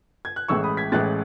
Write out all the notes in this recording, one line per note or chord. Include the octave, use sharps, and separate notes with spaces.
G#6
F#6
A1 A2 G#3 C#6 E6
B5 D#6
G#6 B6
A1 A2 G#3 F#6 A6